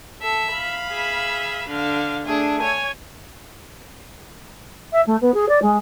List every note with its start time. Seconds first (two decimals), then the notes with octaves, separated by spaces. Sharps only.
0.22 A4 E5
0.51 F5 B5
0.90 G#4 E5
1.69 D3 F5
2.26 A3 D4 G#4
2.62 C#5 G#5
4.92 E5
5.06 A3
5.21 B3
5.34 G#4
5.48 D5
5.62 G#3